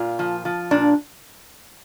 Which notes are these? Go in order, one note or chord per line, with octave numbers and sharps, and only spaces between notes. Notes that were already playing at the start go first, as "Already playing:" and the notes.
Already playing: A#2 F4
F3
F3
A#2 D4